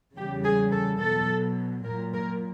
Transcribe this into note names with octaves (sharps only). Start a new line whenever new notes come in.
E2 C#3 E3 G3 G4
G#4
A4
B2 F#3 A4
A#2 F#3 A#4
A#4